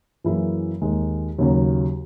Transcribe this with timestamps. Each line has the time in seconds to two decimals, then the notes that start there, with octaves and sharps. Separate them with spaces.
0.24 F#2 E3 A#3 E4 G#4
0.82 D#2 D#3 G#3
1.39 D#2 C#3 F#3